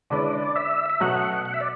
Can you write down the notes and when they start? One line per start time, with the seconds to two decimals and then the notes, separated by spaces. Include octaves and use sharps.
0.10 D3 G#3 C#4 E4 B4 D5
0.56 E5
0.90 E5
1.00 B2 F#3 A3 C#4 F#4 F#5
1.45 F#5
1.54 E5
1.61 D5